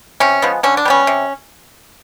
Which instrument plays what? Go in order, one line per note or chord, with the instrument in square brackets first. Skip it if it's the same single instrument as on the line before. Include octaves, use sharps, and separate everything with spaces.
[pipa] C3 C#4
F3 G#3 B3
D3 C#4
D4
G3 B3 C#4
C3